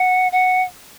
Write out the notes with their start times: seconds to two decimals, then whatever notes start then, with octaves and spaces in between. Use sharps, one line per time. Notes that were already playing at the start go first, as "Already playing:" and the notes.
Already playing: F#5
0.32 F#5